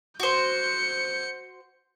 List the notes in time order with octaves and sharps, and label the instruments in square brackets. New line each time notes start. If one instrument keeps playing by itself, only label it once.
[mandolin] F#4 C5 [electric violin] G6 C#7